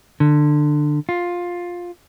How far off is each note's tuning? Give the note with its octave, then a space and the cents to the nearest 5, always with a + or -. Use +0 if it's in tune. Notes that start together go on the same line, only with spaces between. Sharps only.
D3 +20
F4 +10